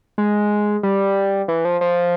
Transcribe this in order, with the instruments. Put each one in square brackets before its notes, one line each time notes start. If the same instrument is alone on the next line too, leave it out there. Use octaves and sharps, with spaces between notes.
[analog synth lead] G#3
G3
E3
F3
F3